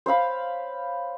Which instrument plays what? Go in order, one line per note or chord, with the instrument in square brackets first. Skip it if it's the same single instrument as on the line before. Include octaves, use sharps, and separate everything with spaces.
[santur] C5 C#5 F5 B5